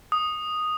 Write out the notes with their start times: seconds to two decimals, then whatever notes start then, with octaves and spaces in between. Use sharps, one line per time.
0.12 D#6